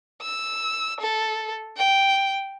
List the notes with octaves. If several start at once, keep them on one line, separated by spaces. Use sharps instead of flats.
E6
A4
G5